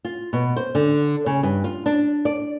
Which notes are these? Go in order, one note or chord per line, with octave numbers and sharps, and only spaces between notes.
F4
B2
C5
D3
C#3
G2
F4
D4
D5